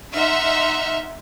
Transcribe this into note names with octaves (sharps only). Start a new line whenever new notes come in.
D#4 E5 F#5 C6 F6